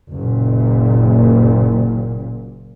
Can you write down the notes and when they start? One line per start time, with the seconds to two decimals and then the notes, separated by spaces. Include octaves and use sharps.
0.11 F#1 A#2